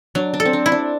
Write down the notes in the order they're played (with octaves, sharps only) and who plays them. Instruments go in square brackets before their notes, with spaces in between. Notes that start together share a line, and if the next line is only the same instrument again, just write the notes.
[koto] F#3 [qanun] D4
[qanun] D4
[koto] A4
[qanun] C4
D4
[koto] E4
[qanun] D4